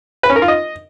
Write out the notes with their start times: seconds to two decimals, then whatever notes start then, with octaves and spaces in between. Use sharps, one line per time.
0.23 B4
0.30 C#4
0.36 A#4
0.42 F4
0.48 D#5